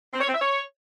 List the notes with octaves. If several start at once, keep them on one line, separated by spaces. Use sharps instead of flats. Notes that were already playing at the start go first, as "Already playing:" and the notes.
C4
C#5
C4
E5
C#5